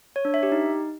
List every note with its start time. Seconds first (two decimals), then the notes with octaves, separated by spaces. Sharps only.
0.16 C#5
0.25 D4
0.34 E5
0.43 G4
0.52 D#4